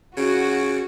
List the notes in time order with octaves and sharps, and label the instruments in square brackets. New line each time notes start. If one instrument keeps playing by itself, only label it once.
[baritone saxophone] C#3 [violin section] F#4